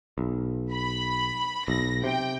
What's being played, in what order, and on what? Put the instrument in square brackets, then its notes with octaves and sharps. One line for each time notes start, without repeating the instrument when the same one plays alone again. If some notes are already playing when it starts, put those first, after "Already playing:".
[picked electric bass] B1
[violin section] B5
[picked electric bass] B1 [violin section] A#6
[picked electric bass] C3 [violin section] G5